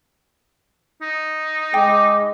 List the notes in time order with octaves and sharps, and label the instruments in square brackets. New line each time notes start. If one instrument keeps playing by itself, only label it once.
[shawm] D#4
[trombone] G#3 [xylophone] G5 [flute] D6